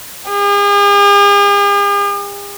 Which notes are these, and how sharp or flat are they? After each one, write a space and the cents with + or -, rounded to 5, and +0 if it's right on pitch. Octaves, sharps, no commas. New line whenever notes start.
G#4 -45